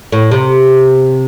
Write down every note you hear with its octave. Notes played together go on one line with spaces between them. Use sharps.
A2
C3